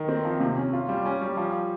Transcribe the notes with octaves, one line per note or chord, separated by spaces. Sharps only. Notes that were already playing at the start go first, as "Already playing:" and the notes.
Already playing: D#3
C4
F3
C3
C#4
F4
G3
C#4
G3
F3